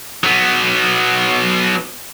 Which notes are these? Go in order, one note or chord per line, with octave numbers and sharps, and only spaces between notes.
F#3 B3